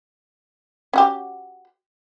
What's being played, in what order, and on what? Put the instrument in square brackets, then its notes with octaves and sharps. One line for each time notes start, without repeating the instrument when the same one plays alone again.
[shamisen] C#4 F#4 G4